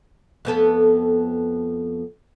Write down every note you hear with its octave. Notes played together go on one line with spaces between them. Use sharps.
F2 B3 A4